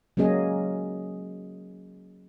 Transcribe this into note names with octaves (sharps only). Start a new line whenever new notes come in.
F#3 A#3 C#4 G#4 D#5